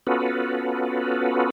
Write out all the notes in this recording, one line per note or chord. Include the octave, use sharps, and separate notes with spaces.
B3 C#4 F4 F#4 A4 B4